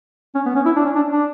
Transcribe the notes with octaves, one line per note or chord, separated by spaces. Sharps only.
C#4
B3
C#4
E4
D4
C#4
D4
D4